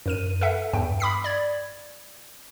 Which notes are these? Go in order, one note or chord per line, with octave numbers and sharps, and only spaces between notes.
F#2 A#4 D#7
A4 B4 E5 F#5
E2 G2 G5
B5 D6 D#6 B6 C7
D5 G#6